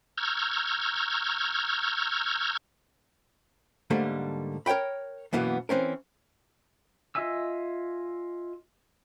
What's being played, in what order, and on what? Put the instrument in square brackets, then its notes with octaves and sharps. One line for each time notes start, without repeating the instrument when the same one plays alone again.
[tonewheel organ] A#5 C#6 E6 F6 G6 G#6
[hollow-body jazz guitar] G#2 D3 G3 A3 A#3
A#4 C#5 D5 G5 B5
F#2 B2 E3 A#3 B3
E3 C4 C#4 A#4
[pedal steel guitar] F4 D#5 E5 G#5 E6